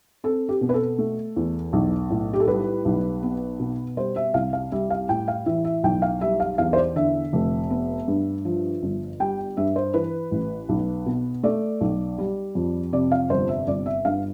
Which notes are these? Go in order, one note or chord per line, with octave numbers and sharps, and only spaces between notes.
C4 A4
G4
B2
B4
A4
A3
E2
B1
A2
G4
A4
G3 B4
B1
B3
B2
G3 C5
E5
C2 F5
F5
G3 E5
F5
A2 G5
F5
E3 E5
E5
B1 G5
F5
G3 E5
F5
E2 F5
C5
D5
D3 E5
F1
B3
G2
F3
G1
G3 G5
G2 E5
C5
E3 B4
A1
B1
B2
A3 D5
B1
G3
F2
C3 D5
F5
G1 C5
E5
G1 D5
E5
G2 F5